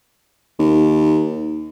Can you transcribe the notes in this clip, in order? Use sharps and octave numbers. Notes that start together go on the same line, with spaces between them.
D#2